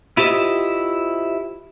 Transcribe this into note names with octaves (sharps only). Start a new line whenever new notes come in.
E4 F4 G4 C5 D#5